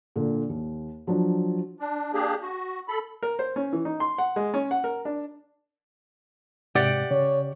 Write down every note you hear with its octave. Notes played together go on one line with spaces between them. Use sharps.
A#2 D3
D#2
F3 F#3 D4
D4
A#3 D4 G4 G#4
F#4
A4 B5
A#4
C5
C#4
E3
D#4
C6
F#5
G#3
C#4
F#5
A#4
D4
G#2 C3 G4 D5 F#5
C#3 C#5